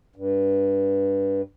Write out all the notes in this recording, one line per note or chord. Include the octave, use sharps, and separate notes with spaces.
G2